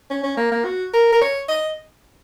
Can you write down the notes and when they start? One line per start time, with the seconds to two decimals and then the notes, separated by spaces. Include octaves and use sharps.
0.10 C#4
0.23 C#4
0.37 A#3
0.52 A#3
0.65 F#4
0.94 A#4
1.12 A#4
1.21 C#5
1.48 D#5